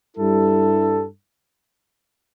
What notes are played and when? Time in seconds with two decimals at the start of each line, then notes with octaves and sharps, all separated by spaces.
0.17 G2 G3 E4 A4